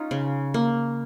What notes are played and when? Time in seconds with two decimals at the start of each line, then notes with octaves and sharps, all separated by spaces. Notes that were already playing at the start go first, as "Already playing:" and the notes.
Already playing: C#4 D#4 F4
0.11 C#3
0.54 A#3